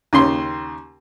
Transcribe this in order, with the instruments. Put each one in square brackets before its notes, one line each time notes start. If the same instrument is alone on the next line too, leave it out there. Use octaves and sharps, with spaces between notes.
[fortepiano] D#2 C#3 C6